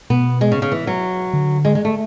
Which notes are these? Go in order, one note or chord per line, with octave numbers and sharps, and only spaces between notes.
B2 B3
G#3
C#3
C#3
E3
F#3
D3
G#3
G#3
A3